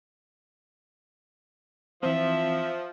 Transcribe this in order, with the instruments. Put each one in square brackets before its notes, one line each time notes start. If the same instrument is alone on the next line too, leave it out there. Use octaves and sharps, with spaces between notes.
[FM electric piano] E3 C4 [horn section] F3 [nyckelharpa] E5